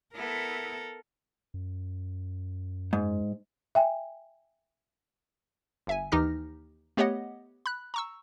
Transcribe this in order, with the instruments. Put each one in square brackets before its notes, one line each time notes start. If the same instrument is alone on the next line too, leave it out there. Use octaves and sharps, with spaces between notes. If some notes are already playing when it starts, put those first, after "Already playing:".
[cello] B3 E4 [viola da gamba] A4 A#4
[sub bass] F#2
[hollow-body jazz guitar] G#2
[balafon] E5 G5 G#5
[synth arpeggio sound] G1 E5 G#5
D#2 E3 D#4 G4 F6 A#6
A3 B3 G4 C#5 D#5 F#5
B5 F#6
A#5 C#6 E6